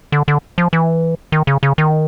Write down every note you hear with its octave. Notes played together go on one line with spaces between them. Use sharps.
D3
D3
F3
E3
D#3
C#3
C#3
D#3